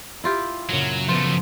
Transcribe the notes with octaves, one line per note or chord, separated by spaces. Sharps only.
E4 F4 G4
F#2 A#2 C#3 F#3
F#2 F3 A3 B3 F4